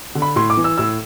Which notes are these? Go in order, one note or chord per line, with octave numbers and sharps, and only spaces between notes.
D3
B5
A2 C6
D6
E3
E6
A2 E6